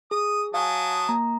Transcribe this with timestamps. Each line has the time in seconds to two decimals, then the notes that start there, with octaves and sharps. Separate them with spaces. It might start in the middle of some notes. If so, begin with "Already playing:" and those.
0.11 G#4 D#6
0.54 F#3 F5 G#5 A5 D#6
1.09 A#3 A#5